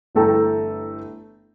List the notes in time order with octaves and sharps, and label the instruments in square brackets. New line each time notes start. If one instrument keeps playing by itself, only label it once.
[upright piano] G1 E3 A3 A4 G5 A#5